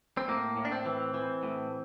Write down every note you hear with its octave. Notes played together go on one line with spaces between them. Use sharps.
C4
A2 A#3
A2
D4
C4
E3
E3
A2